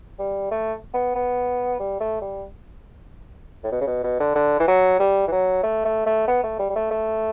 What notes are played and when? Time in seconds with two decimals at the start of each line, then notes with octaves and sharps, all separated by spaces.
0.19 G3
0.51 A3
0.94 B3
1.15 B3
1.80 G3
2.00 A3
2.21 G3
3.64 A2
3.72 B2
3.81 C#3
3.87 B2
4.04 B2
4.20 D3
4.35 D3
4.60 E3
4.68 F#3
5.00 G3
5.27 E3
5.32 F#3
5.63 A3
5.85 A3
6.06 A3
6.28 B3
6.43 A3
6.59 G3
6.70 G3
6.76 A3
6.91 A3